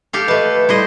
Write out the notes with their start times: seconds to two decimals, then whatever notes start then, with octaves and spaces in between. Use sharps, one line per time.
0.13 G4 A4 F5
0.28 A3 B4 D#5 A5
0.69 G3 E4 A4 C5 D#5